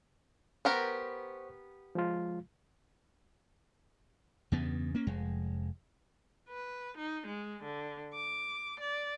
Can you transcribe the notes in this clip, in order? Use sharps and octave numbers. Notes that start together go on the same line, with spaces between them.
B3 G4 A#4 C5 F#5 C#6
F3 G#3 F4
E2 G2 C#3 B3
A#3 C#4
F1 F2 G#3
B4
D#4
G#3
D3
D6
D5